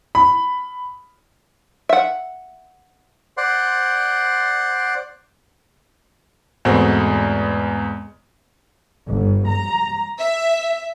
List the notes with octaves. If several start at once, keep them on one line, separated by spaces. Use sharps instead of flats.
B5
E5 F#5
C5 D5 F#5 C6
E2 G#2 B2 A3 C4
G1
A#5
E5